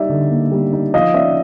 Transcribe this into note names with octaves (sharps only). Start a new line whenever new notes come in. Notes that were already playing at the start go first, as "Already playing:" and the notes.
Already playing: G3 D#4 D5 E5
D3
A#3
G3
D#4
F3 D#5 F5
C#4 D5 E5